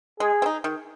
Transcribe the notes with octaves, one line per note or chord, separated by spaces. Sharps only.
G#3 G#4
C4
D#4
D#3